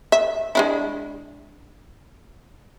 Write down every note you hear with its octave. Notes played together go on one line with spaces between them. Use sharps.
E5
G#3 D4 E4